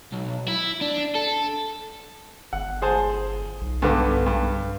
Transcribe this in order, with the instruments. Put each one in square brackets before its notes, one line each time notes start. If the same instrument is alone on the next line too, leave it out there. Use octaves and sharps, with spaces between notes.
[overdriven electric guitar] B1
E4
D4
A4
[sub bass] G1 [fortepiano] F#5
[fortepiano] G#4 C5 A5
[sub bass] B1
[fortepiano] G2 D3 B3
G2